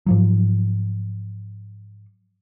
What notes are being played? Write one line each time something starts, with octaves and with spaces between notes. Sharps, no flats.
G#2 F3 F#3